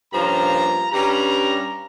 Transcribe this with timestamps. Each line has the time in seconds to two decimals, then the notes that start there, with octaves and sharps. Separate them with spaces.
0.13 G2 F3 A#3 C#4 A#5
0.92 G2 G3 C#4 A#5